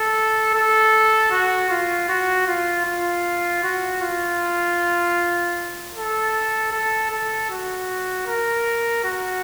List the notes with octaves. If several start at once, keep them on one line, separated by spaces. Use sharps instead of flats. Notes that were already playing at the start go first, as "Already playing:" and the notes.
Already playing: A4
A4
F#4
F4
F#4
F4
F4
F#4
F4
A4
A4
A4
F#4
A#4
F#4